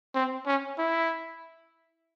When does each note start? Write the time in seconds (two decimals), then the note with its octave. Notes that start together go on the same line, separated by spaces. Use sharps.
0.15 C4
0.46 C#4
0.78 E4